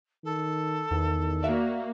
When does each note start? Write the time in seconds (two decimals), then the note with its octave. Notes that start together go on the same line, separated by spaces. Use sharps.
0.24 D#3 A4
0.91 E2 D#3
1.43 A#3 F#4 D5 E5 F5